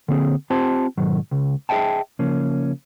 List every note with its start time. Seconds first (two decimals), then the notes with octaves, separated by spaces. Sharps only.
0.08 D3 A#3 C4 G#4
0.50 C4 F4 G4 C5 A5 C6
0.98 G#2 B2 D#3 F#3
1.31 C#2 C#3
1.69 G#4 D#5 E5 G5 A5
2.19 C#3 F3 A#3 C#4